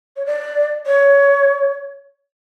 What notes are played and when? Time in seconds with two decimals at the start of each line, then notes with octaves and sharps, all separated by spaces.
0.16 C#5
0.26 D5
0.87 C#5